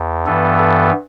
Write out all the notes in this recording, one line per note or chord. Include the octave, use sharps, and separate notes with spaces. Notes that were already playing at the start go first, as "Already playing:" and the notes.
Already playing: E2
G2 E3 B3 A4
A4